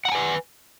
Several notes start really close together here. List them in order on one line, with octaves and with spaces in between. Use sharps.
F#5 A#5 G#5 B4